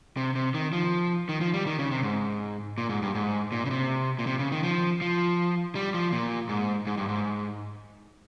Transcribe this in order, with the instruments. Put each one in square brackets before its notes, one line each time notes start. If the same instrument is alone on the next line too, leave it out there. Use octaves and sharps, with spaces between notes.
[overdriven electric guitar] C3
C3
D#3
F3
D#3
F3
G3
D#3
C#3
C3
G#2
A#2
G#2
G2
G#2
A#2
C#3
C3
A#2
C3
C#3
D#3
F3
F3
G3
F3
A#2
G#2
G#2
G2
G#2